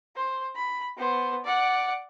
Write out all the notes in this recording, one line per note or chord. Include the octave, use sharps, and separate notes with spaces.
C5
B5
B3 C5
D5 F#5